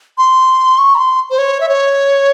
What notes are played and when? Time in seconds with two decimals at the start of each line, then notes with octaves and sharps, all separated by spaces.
0.18 C6
0.79 C#6
0.95 A#5
0.98 C6
1.31 C5
1.38 C#5
1.61 E5
1.69 C#5